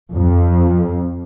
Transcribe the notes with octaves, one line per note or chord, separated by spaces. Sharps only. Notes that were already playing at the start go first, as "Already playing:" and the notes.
F2